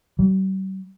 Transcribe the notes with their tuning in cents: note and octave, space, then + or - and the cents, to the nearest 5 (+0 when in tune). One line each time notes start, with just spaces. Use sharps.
G3 -45